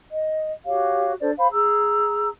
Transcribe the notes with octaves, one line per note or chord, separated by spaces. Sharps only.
D#5
F#4 G4 C#5 F5
D4 A4 C5 D5
C5 F5 B5
G#4 A#5 E6